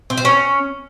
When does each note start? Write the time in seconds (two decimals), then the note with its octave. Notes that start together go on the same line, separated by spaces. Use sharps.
0.10 C4
0.17 C5
0.25 C#4